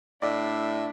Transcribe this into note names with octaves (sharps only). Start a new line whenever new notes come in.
A2 D4 D5 E5